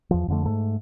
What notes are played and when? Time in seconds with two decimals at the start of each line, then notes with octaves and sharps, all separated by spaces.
0.11 E2 F3
0.28 F2 D3 A3
0.45 G#2 A3